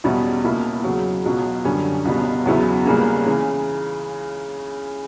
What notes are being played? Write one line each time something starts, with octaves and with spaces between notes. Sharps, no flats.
E2 B2 G3 C#4 E4
C#2 B2 A#3 E4
E2 C#3 F#3
C#2 B2 F#3
F#2 D3 G3 C#4
C#2 B2 G3 B3
E2 C#3 F#3 B3 E4
C#2 C#3 G3 A#3 C#4
C#3 E3